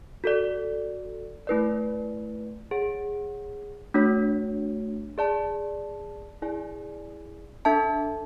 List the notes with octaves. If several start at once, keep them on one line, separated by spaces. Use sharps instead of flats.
F#4 A4 D5
A3 E4 B4 D5
G#4 C#5 F#5
A3 D4 F#4 C#5
G#4 D5 A5
E4 G#4 D5 G#5
D4 A4 E5 A5